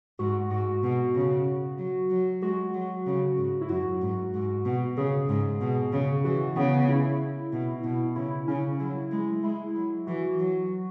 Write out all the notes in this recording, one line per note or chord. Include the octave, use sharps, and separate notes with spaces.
G#2 F#4
G#2 F#4
B2
C#3
F#3
F#3
G#3 F#4
F#3
C#3
G#2
E4
F#2 F#4
G#2
G#2
B2
C#3 G#4
G#2
B2
C#3
E3 F#4
C#3 B3
E4
B2
B2
C#3 E4
C#3 C#4
F#3 E4
G#3
G#3 E4
F#3
E3 F#4
F#3